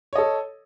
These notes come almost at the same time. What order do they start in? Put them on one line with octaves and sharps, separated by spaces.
C#5 D#5 A4